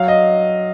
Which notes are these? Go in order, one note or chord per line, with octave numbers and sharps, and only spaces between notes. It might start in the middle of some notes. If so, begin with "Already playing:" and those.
Already playing: F#3 F5
D#5